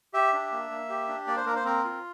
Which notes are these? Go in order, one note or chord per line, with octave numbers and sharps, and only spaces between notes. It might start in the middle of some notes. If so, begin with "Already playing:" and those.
G4 E5
D4
A#3
A#3
G4
D4
A#3 D5
C5
A#3 A#4
C5
C4 A#4
F4